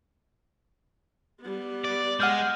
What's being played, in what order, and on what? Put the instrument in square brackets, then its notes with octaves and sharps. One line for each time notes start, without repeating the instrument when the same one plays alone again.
[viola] G3 B3
[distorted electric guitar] D5
[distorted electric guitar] G#3 [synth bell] F#5 F6 G6